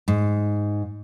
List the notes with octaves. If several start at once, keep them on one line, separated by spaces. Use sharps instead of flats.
G#2